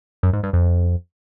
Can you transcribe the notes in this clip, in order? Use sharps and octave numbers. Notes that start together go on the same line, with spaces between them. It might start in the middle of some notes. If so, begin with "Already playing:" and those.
F#2
G#2
G2
F2